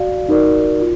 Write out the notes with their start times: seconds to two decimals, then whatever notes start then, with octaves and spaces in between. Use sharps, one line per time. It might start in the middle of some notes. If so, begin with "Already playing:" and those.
Already playing: F#4 D5 F5
0.29 D#4 F#4 A#4 D5
0.81 F4